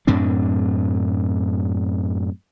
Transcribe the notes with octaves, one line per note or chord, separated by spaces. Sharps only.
F#2 A2 C4 D4